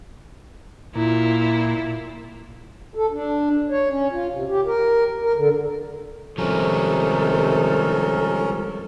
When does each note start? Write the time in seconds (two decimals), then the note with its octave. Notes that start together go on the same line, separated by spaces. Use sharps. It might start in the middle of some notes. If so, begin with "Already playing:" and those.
0.95 A#2 E4 F4
2.95 A4
3.11 D4
3.70 C#5
3.90 C#4
4.12 F4
4.31 C3
4.49 G4
4.66 A#4
5.23 A#4
5.36 D3
6.38 C3 D#3 F3 G3 G#3 C#4 A4 A#4